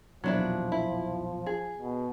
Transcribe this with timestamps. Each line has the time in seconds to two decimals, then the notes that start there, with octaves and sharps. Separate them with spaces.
0.24 B1 E2 A#2 F3 F#3 D4 E4
0.72 E4
1.46 G#4
1.79 B2